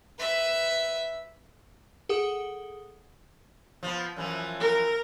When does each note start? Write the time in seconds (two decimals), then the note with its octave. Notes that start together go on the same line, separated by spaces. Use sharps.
0.19 B4 E5
2.09 G#4 A4 F#5 D#6
3.83 F3 B3
4.16 F#2 E3 F3
4.60 A#4